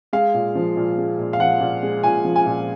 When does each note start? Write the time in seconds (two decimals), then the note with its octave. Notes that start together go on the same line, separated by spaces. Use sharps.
0.13 G#3 F5
0.34 A#2
0.55 F3
0.77 A#2
0.98 G#3
1.19 A#2
1.33 F5
1.39 F3 F#5
1.60 A#2
1.83 G#3
2.03 A#2 G#5
2.25 F3
2.36 G#5
2.46 A#2